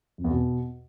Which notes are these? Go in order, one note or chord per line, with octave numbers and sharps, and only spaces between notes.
F2
E2
B2